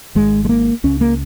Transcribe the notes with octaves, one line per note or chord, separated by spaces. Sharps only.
G#1 G#2 G#3
G#3
A#3
C#2 C#3 C#4
A#3